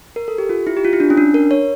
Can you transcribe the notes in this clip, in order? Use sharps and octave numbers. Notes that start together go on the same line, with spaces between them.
A#4
A4
G4
F4
E4
G4
F4
E4
D4
C#4
D4
A#4
C#5